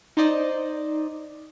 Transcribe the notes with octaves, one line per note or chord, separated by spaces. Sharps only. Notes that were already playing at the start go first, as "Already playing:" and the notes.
D#4 C5 D5 D#5